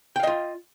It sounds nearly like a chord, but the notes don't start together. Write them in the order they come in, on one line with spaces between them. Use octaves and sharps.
G5 F5 D#5 F4